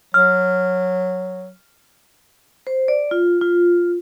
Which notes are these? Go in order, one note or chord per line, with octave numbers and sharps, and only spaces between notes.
F#3 F6
C5
D5
F4
F4